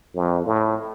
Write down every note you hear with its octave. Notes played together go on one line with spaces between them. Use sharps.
F2
A2